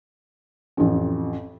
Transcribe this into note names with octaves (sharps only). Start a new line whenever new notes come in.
A1 F2